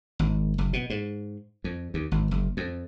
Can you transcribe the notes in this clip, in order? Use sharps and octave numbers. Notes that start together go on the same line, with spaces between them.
G#1
F#1
B2
G#2
F2
D#2
G#1
F#1
F2